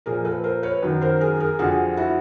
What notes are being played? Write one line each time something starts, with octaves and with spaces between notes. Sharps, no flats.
A#2 F3 G#4 A#4
A4 B4
A#4 C5
B4 C#5
F#2 D#3
A#4 C5
G#4 A#4
G#4 A#4
F2 D3 F3 F#4 G#4
E4 F#4